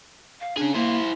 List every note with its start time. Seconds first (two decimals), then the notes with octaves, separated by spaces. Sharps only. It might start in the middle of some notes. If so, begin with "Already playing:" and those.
0.40 F5
0.57 C#4 D4 G#4
0.75 A#3 E4 C5